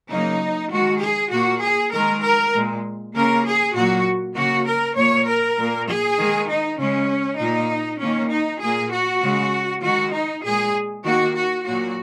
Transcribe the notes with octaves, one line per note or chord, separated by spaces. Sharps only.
C#3 F#3 A#3 D#4
D#3 G#3 F#4
G#4
A#2 A#3 F#4
G#4
D#3 G#3 A#4
A#4
A#2 G#3
C#3 A#3 A#4
G#4
A#2 F#3 A#3 F#4
C#3 A#3 F#4
A#4
A#2 A#3 C#5
A#4
A#2 A#3
G#4
D#3 G#3
D#4
C#3 G#3 C#4
A#2 A#3 D#4
D#3 A#3 C#4
D#4
A#2 A#3 G#4
F#4
C#3 G#3
D#3 G#3 F#4
D#4
A#2 G#3 G#4
D#3 A#3 F#4
F#4
A#2 F#3 A#3 F#4